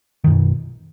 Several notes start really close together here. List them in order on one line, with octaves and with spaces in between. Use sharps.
D#3 F#2 B2